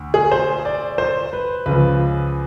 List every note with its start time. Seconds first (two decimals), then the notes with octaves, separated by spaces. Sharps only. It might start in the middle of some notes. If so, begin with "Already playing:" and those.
Already playing: D2
0.14 G#4
0.31 C5
0.65 D5
0.98 C5
1.33 B4
1.66 C#2 C#3 F3 B4